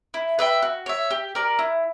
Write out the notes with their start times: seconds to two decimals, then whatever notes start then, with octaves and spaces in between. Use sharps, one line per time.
0.14 E4
0.39 B4 E5 G5
0.62 F#4
0.86 C#5 E5
1.10 G4
1.35 A#4 D5
1.59 E4